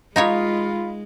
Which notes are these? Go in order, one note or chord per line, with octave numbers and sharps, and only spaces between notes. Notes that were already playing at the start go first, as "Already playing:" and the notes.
G#3 D#4 F4 A#4 C#5 D#5 F5 B5